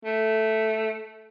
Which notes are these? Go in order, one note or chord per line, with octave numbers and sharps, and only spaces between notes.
A3